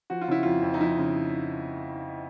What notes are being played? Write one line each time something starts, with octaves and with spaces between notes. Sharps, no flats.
F3 F#4
F4
C#3 E4
F2 F4
F2
D#4
F3 E4
C#3